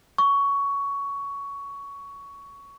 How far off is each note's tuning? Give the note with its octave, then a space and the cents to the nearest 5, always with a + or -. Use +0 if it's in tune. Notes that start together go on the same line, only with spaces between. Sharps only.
C#6 +15